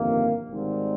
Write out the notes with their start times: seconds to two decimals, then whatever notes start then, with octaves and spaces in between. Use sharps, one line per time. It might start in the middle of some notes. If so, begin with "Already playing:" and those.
Already playing: G1 F2 C3 D#3 A#3
0.48 G#1 G#2 D#3 G3 C4